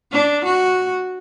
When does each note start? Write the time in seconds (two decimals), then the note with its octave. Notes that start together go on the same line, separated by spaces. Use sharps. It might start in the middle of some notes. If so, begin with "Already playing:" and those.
0.12 D4
0.45 F#4